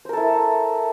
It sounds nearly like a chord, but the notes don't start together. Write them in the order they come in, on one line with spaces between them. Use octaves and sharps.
C5 A#4 A4 E4